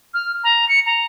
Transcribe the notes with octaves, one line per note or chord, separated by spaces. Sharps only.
F6
A#5
C#7
A#5